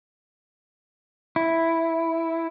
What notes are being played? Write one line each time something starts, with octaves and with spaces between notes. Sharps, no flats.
E4